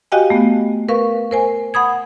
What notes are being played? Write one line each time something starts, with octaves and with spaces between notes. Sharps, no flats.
F#4 G4 D#5 F5 G5 G#5
A3 B3
A#4 B4 F5 C#6
A#4 C5 G#5
F#5 B5 D#6 G#6